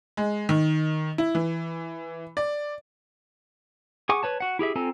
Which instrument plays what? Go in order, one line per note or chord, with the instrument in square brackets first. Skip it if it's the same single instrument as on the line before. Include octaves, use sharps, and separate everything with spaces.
[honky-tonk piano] G#3
D#3
E4
E3
D5
[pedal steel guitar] G#4 F#5 G#5 C#6 D6
B4 C#5 A5
F#4 F#5
E4 G4 G#4 E5
C4 F4 A4 G#5 A#5